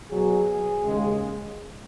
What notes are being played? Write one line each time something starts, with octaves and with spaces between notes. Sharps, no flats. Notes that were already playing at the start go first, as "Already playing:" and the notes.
B2 F#3 G#4
D#2 C#3 G#3